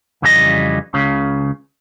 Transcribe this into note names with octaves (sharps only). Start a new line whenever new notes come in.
F2 C#3 E3 G3 G4 D#5
C#2 C#3